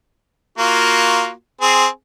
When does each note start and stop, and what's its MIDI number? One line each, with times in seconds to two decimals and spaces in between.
0.58 1.31 58
0.58 1.31 65
0.58 1.31 66
1.61 1.86 60
1.61 1.86 68